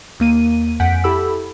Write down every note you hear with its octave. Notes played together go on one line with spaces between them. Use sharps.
D#2 A#3 D#7
F2 F#5 G#5 G6 B6 D7
E4 G4 A4 B5 E6